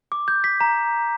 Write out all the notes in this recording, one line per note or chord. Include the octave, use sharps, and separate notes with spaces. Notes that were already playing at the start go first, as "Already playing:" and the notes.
D6
G6
B6
A#5